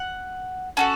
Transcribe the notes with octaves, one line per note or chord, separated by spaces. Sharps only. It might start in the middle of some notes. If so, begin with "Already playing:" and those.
Already playing: F#5
C#4 F#4 A4 A5